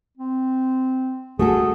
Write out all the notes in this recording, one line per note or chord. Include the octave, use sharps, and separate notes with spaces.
C4
A3 F#4 G#4 A4